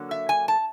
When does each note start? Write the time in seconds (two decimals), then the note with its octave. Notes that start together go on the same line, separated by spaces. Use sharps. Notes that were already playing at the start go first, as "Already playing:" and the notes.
Already playing: D3 F#3 A#3
0.11 E5
0.29 G#5
0.48 A5